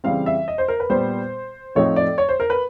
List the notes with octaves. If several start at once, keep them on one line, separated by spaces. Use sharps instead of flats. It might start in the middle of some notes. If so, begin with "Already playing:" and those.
C#3 E3 G3 C4 F5
E5
D#5
C5
A#4
B4
A#2 G3 B3 C5
A2 F3 A3 C4 D#4 C#5
D5
C#5
C5
A#4
B4